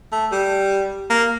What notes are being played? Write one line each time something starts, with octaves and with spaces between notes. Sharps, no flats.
A3
G3
A#3